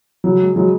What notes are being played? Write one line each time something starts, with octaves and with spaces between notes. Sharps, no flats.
C#3 F#3
G#3
F#3 G#3